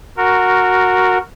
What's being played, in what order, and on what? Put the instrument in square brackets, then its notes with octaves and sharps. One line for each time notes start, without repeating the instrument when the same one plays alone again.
[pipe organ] F#4 A#4